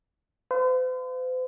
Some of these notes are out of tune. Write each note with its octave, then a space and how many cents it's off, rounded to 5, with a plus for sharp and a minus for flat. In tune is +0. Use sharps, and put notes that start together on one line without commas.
C5 -45 F5 +0